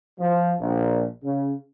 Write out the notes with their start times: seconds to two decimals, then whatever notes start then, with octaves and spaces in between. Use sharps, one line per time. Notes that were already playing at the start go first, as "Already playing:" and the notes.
0.20 F3
0.60 A#1
1.24 C#3